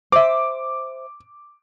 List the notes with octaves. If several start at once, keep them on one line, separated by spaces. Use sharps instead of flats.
C5 E5 D6